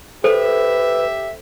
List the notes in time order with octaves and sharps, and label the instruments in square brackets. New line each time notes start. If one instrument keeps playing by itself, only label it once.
[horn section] G4 E5 [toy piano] A4 C5 [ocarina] B4